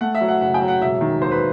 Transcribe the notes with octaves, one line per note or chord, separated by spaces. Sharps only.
A3 F#5
E5
F#3
F#5
F#1 F#5
G5
F#3
F#5
E1 E5
D#3
D#2 C5
B4